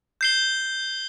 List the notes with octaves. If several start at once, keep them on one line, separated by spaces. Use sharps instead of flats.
G6 C7 G7